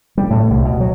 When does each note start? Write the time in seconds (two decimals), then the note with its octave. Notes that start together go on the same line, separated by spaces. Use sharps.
0.18 G3
0.30 A2
0.50 C2
0.65 B2
0.80 F#3